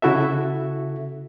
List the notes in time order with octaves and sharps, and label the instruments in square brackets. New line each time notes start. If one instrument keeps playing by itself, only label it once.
[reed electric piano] C#3 E4 F#4 A4 E5